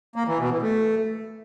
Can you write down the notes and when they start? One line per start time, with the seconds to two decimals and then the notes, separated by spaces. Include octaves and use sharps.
0.16 A#3
0.27 E3
0.39 B2
0.51 E3
0.62 A3